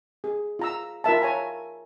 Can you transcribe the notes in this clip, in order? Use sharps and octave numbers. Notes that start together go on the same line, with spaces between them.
G#4
F4 A#5 E6
F4 A#4 E5 A5
C#5 G#5 A#5